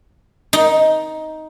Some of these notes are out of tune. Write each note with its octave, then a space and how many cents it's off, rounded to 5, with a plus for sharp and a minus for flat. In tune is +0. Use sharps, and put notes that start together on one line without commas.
D#4 +10